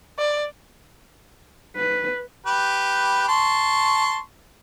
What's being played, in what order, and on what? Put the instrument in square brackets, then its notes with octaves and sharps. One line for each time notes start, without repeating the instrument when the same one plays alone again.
[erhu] D5
[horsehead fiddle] B4
[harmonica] G4 B4
A5 C6 C#6